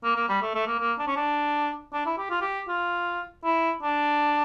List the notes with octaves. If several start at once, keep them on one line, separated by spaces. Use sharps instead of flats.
A#3
A#3
G3
A3
A3
A#3
A#3
D4
C#4
D4
D4
E4
G4
F4
G4
F4
E4
D4